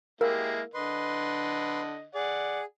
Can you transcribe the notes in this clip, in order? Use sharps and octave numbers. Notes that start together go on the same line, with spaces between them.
G#3 A#3 E4 G4 A#4 F5 E6
D3 B4 D#5 C6
G#4 D5 F#5